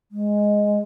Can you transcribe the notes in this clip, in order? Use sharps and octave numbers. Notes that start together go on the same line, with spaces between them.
G#3